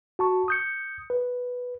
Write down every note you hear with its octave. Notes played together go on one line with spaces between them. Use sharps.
F#4 A5 C#6
D#6 G6 C#7
B4